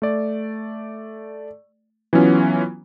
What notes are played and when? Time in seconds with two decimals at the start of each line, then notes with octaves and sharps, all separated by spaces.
0.02 A3 D5
2.13 E3 F#3 B3 C#4 F4